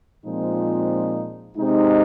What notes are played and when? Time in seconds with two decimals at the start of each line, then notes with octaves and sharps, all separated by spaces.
0.25 A#2 F3 G#3 C4 D#4
1.57 C3 G#3 D#4